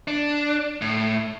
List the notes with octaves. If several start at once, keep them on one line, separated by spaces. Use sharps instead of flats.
D4
A2